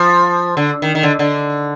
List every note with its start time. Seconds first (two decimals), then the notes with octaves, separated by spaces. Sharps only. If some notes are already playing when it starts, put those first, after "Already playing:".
Already playing: F3
0.57 D3
0.82 D#3
0.95 D#3
1.03 D3
1.19 D3